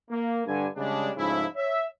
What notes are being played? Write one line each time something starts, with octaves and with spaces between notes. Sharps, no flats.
A#3
G2 D3 G#5
C#3 G3 G#3 C#4 D4
G#2 C#3 F3 A3 E4
C#5 E5